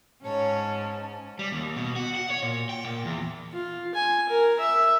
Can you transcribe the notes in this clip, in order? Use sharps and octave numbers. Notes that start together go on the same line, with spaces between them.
G#2 C#4 C#5 A5
G3
D#2
B2
F#4
F#5
C#5
A#2
G5
A#2
E2
F4
G#5
A#4
E5